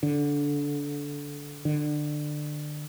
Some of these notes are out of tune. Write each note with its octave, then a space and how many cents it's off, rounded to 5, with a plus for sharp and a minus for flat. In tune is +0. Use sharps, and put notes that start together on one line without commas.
D3 -20
D3 +20